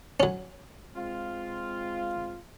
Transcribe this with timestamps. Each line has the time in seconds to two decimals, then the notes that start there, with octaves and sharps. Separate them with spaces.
0.20 F#3 C#4
0.95 G#3 C4 F4